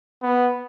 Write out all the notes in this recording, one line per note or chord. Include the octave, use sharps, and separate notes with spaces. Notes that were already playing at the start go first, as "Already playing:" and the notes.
B3